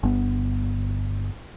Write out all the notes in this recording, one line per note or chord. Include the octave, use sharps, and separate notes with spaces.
G1 B3